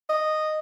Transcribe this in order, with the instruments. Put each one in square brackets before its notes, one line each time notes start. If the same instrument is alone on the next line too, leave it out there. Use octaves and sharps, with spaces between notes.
[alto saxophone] D#5